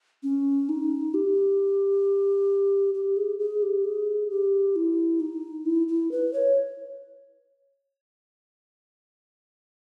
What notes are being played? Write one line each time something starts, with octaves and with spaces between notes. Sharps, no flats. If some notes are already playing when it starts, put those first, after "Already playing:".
C#4
D#4
G4
G4
G#4
G#4
G4
G#4
G4
E4
D#4
E4
E4
B4
C#5